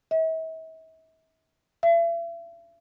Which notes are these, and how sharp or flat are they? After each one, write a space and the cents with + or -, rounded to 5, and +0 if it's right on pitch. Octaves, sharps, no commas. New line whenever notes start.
E5 -40
E5 +40